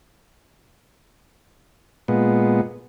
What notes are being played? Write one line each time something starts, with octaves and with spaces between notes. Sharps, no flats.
A#2 G#3 B3